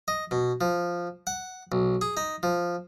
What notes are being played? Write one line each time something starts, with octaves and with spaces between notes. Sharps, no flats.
D#5
B2
F3
F#5
B1
G#4
D#4
F3